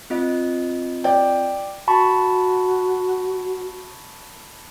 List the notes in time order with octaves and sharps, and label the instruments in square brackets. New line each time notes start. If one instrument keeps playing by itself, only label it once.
[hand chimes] C4 F4 D#5
[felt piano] D5 G5
[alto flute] F#4 [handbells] A5 B5 C#6